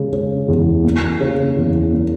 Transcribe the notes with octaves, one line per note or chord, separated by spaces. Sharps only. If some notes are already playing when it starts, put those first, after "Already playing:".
Already playing: C#3 G#3
C#3
E2
A#3
C#3
E2
A#3